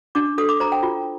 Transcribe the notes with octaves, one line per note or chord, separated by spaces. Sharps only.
D4 D6
A4 D#6
D6
C5 A#5
G5
F4